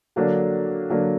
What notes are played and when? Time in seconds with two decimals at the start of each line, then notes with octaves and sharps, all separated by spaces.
0.16 D3 F#3 A#3 D4
0.90 D3 F#3 A#3 D4